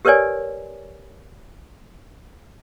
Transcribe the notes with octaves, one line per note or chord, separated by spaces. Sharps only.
G4 A#4 B4 C#5 D5 G#5